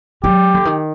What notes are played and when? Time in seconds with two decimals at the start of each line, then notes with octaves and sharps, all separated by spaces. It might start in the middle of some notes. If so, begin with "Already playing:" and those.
0.24 F#3 G4
0.54 D3
0.65 D#3